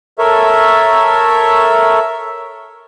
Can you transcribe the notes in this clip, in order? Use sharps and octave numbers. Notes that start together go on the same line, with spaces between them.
A4 A#4 C#5 E5